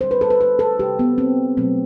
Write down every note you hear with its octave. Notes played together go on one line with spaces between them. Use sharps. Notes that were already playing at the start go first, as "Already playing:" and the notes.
D3 G3 C5
B4
A4
B4
B4
A4
C3 G3 G4
B3
C4
B2 F#3 A3 C4